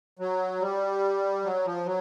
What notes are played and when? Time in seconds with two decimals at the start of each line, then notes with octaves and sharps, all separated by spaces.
0.19 F#3
0.61 G3
1.44 F#3
1.65 F3
1.86 F#3